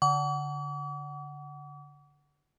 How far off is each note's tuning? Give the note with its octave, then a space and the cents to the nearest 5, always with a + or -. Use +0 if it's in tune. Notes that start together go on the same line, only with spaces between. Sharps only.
D3 -25 F#5 +15 D6 -45